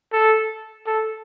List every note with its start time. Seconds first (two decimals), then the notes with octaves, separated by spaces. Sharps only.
0.13 A4
0.87 A4